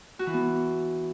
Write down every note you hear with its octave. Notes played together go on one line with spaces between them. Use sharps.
F#4
E3
B3